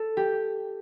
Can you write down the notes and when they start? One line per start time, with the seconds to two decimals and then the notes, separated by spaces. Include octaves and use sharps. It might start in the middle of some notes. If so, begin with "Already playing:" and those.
Already playing: A4
0.17 G4